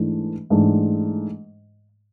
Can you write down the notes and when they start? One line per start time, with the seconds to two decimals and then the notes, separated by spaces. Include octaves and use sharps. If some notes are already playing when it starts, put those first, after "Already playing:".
Already playing: G#2 E3 A3 D4
0.50 G#2 E3 A3 D4